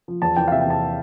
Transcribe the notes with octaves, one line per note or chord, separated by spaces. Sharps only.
F3
E2 A5
E3 G5
F5
C3 E5
G5
E2 A5